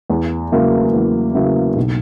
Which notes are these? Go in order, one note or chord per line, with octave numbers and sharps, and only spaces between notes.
E2
C#3 F#3 A#3 E4
E2
C#3 F#3 A#3 E4
B1